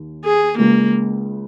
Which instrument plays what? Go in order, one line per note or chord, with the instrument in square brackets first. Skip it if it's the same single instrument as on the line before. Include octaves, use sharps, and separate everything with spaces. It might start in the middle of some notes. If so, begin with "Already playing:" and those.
Already playing: [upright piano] D#2 D#3 A#3
[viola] G#4
[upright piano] C#2 C#3 G#3 [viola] A#3